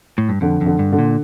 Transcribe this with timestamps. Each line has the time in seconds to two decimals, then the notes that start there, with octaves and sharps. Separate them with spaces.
0.18 A2
0.29 G2
0.41 F2 D3
0.61 F2
0.66 D3
0.79 G2
0.92 D3
0.99 A#2